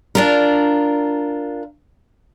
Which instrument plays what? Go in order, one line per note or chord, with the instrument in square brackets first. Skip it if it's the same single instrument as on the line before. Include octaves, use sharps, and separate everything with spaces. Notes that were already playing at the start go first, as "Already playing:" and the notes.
[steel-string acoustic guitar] D4 F4 A#4